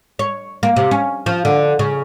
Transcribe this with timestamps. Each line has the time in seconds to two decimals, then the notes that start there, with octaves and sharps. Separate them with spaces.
0.19 C#5
0.63 A#3
0.76 C3
0.91 C#4
1.26 F3
1.45 D3
1.79 C#3